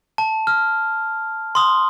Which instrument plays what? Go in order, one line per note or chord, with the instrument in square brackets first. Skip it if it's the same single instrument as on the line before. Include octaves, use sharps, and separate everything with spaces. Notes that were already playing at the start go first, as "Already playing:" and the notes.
[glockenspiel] A5
F6
C6 D#6